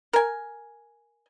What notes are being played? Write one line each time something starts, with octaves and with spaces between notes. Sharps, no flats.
A#4 G#5